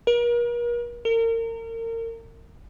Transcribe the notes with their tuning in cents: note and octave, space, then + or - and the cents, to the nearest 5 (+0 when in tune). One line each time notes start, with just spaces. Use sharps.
A#4 +40
A#4 -35